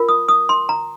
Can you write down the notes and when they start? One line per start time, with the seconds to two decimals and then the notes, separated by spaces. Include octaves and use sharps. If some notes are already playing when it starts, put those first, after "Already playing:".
Already playing: F4 A#4
0.09 D#6
0.28 D#6
0.49 C6
0.69 A#5